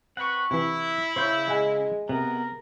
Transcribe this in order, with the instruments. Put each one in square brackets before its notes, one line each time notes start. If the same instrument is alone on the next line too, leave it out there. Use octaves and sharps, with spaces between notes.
[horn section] C4 B4 [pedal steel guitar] F#5 C#6
[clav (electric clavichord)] C3 E3 [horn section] E4
[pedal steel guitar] C#3 F5 G6 [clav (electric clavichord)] C5 C#5 [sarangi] E5
[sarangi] G#3 [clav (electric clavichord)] E5 F#5 G#5
[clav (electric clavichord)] C3 [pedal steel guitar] B3 [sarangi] A#4